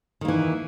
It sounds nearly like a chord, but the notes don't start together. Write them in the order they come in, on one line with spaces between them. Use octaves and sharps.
D#3 A#3 E3